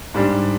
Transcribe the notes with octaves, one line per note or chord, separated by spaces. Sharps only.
G#2 G3 D4